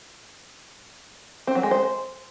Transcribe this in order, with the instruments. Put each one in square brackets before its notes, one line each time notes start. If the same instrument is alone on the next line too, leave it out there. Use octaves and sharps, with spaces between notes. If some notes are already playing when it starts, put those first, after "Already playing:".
[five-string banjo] C4
F#3
G#3
C5